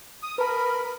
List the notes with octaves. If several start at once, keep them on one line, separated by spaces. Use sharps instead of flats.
D#6
A#4 B4 A5 B5